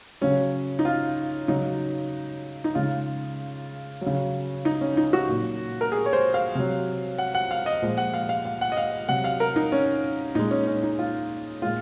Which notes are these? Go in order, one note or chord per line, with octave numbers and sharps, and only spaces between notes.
C#3 F#3 C#4
D#4
F4
C#3 F#3 D#4
D#4
C#3 G#3 F4
F#3
C#3
D#4
C#4
D#4
F#4
A#2 F#3
A#4
G#4
C#5
C5
F5
C3 F#3
F#5
F#5
F5
D#5
A#2 F3 G#3
F#5
F5
F5
F5
F#5
D#5
F5
C3 F#3 F#5
F5
A#4
D#4
C#4
A#2 G#3 D#4
C#4
C#4
D#4
F4
A#2 G#3 F4